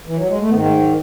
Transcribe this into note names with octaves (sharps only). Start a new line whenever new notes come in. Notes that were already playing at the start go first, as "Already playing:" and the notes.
E3
F#3
G#3
A3
G#2 D#3 B3
A3
F#3